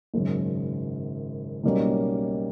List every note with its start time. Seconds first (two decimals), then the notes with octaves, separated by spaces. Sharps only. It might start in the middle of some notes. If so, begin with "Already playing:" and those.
0.14 G#1 F#2 C#3
1.64 B1 B2 G3 A#3 C#4